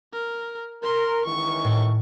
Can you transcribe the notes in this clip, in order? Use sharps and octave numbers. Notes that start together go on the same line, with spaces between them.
A#4
A#4 C6
C#2 D#3 E3 C#6
A2